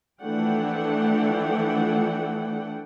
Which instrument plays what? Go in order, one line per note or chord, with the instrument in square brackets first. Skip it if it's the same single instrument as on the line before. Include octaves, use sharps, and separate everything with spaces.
[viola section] E3 F3 A3 D4 F#5 G5